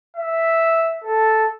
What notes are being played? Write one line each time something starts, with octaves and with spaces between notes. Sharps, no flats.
E5
A4